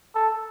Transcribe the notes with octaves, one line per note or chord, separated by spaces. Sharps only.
A4